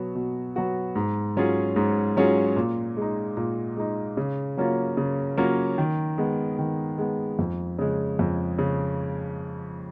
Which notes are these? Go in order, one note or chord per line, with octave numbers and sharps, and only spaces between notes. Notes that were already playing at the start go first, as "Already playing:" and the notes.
Already playing: B2 F#3 B3 F#4
B2
F#3 B3 F#4
G#2
F#3 C#4 F4 G#4
G#2
F#3 C#4 F4 G#4
A#2
G#3 D#4
A#2
G#3 D#4
C#3
F#3 A#3 C#4 F4
C#3
F#3 A#3 C#4 F4
D#3
G#3 B3
D#3
G#3 B3
F2
C#3 G#3
F2
C#3